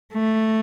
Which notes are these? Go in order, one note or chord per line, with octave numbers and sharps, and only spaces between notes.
A3